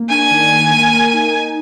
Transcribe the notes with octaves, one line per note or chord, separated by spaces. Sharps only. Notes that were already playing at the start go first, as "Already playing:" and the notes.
Already playing: A#3
D4 G#5
D#3
A#3
A#4
A#3
D#4
D#4